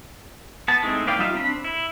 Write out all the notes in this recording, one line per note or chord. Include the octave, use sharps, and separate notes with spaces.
B3 A5
G#3 A3 C4 D#4 E4
A3 B4 D5 F5 G5
G3 D#4 F4 E5 F5
C4 D4 B5
E4